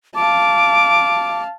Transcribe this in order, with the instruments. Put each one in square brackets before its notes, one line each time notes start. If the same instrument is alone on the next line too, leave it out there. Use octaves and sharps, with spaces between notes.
[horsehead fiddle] F5 A5 [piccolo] D6